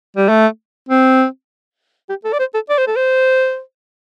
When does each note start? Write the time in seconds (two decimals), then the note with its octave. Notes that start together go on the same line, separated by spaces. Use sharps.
0.17 G3
0.29 A3
0.89 C4
2.09 G4
2.24 A4
2.33 D5
2.39 C5
2.54 A4
2.69 D5
2.78 C5
2.87 A4
2.96 C5